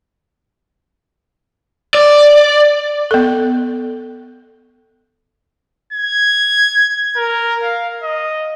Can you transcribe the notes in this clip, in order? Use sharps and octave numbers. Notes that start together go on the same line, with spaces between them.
D5
B3 A4
G#6
A#4
F5
D#5